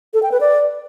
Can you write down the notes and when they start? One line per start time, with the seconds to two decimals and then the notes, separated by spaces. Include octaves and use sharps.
0.14 A4
0.23 G5
0.32 B4
0.41 D5